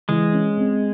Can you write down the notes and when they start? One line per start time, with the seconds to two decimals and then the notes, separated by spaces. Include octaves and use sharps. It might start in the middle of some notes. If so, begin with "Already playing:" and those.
0.09 E3 G#3
0.33 C#4
0.57 C4